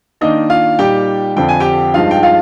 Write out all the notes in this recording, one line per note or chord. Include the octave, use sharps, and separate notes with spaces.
D#3 A#3 D4 D#4 D#5
F4 F5
A#2 G3 A#3 D#4 G4 G5
F2 D3 F3 C4 G5
G#5
G4 G5
G2 F3 G#3 D#4 F4 F5
G5
F4 F5